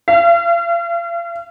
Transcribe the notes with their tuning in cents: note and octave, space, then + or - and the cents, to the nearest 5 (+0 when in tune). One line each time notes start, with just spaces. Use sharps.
F5 -40